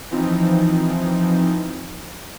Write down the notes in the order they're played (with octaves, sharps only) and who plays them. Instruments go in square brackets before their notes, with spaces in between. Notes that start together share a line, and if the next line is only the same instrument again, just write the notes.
[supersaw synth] E3 F3 C4 D#4